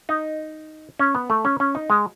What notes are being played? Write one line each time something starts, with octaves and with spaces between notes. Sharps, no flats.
D#4
C#4
B3
A3
C#4
C#4
D#4
G#3